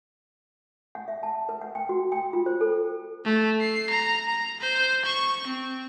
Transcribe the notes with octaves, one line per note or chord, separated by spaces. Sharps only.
F#5
E5
A5
B4
F#5
G5
F#4
G5
F4
C5
A4
A3
C7
A#5
A#5
C5
C#6
C4